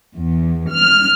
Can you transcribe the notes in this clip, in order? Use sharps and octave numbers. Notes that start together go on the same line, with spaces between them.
E2
F6